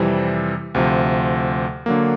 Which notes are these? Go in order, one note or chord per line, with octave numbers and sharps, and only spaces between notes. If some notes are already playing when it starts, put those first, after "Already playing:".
Already playing: F2 C3 E3 G3 C4
D2 C3 F3
D3 F#3 A#3